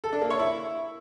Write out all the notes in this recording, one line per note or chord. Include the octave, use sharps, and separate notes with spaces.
A4
D4
A#3
C#5
E4